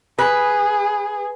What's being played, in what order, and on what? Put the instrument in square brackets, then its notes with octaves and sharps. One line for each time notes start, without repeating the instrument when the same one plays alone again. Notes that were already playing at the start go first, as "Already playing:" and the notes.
[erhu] G#4 [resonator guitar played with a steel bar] B4